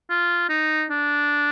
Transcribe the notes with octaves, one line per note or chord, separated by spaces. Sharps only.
F4
D#4
D4